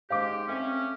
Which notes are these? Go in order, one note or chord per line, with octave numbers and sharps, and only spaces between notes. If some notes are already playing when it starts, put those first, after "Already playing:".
G#2 G#3 G4 F5 D6
A3 C4 C#4